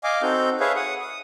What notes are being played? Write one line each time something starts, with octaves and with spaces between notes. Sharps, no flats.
D#5 F5 G#5 D6
C4 D#4 F#4 A4 G6
G#4 B4 C#5 E5 F5
F#5 D#6
D#6